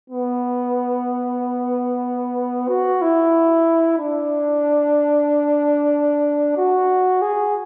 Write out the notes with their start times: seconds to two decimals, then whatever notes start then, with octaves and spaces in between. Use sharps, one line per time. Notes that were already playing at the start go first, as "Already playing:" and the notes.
0.10 B3
2.68 F#4
3.02 E4
3.98 D4
6.57 F#4
7.22 G#4